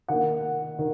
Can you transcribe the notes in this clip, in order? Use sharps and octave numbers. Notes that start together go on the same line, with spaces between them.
D#3 A#3 F#5
D#3